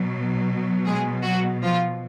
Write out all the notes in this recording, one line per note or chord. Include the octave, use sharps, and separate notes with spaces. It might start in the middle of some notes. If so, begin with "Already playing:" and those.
Already playing: B2 F#3
G#3 G#4
F#3 F#4
F3 F4